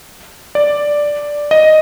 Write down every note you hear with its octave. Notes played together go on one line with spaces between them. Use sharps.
D5
D#5